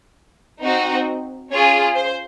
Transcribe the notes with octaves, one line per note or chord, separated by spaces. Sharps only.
C4 D#4 F#4
C#4 F4 G#4 C#5
C5